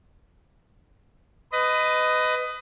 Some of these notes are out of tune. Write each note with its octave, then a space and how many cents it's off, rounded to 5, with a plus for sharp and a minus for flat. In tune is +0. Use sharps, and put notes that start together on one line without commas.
B4 +25 D#5 +0